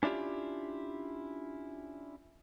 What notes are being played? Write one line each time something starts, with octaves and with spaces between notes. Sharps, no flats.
C#4 D4 E4 F4 G4